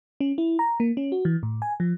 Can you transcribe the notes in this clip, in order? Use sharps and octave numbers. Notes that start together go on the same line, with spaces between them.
C#4
E4
A#5
A#3
C#4
F#4
E3
A2
G#5
F3